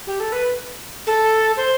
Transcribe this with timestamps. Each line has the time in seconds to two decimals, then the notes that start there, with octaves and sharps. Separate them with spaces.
0.07 G4
0.20 A4
0.32 B4
1.07 A4
1.57 C5